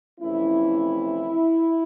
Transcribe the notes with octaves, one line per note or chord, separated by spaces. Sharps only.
F2 C3 E3 A3 C#4 E4